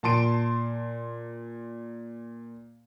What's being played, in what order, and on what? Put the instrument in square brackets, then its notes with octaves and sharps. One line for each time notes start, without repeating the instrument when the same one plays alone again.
[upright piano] A#2 A5 C6 D7